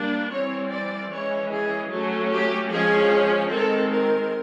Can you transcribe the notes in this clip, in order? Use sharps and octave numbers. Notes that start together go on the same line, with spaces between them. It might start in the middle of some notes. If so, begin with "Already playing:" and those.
Already playing: G3 A#3 D4
E3 G3 C4 C#5
D5
E3 G#3 C#4 C#5
G#4
F#3 A3 C#4 A4
G4
F3 G#3 C#4 G#4
D#3 G#3 C4 A4
A#4